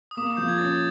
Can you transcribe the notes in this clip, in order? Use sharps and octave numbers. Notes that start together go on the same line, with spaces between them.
D#6
A#3 D6
D#6
F3 G6
G#6
C#4 A6